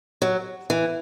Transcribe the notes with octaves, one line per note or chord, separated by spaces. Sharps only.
F#3
E3